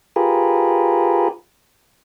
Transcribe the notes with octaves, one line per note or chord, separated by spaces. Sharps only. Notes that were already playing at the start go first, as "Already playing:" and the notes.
F4 G4 G#4 A#4 B4